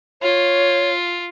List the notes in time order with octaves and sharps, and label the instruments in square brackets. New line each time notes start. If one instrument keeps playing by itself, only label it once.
[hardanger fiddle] F4 [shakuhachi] C#5